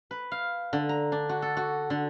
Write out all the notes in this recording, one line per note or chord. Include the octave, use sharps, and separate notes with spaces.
B4
F5
D3
A#5
D4
F#4
A4
F#4
D3